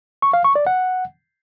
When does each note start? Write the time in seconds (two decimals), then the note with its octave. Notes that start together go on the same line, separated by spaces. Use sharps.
0.22 C#6
0.33 F5
0.44 C#6
0.55 D5
0.67 F#5